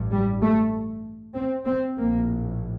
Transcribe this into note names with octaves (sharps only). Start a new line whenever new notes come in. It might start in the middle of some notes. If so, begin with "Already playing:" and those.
Already playing: A1 G2
G3
A3
C4
C4
A#1 A2 A#3